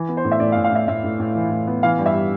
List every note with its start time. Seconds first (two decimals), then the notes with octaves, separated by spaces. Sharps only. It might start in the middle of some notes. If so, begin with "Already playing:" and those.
Already playing: E3
0.08 B3
0.17 C5
0.25 A2
0.32 E5
0.40 A2 D5
0.52 F5
0.57 A2
0.64 F5
0.71 A2 E5
0.88 A2 E5
1.04 A2
1.19 A2
1.35 E3
1.50 A2
1.67 B3
1.83 E3 F5
1.99 G2
2.06 E5
2.14 G3